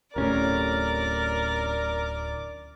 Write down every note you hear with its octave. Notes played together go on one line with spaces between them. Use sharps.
D1 A2 C3 C#4 A#4 D5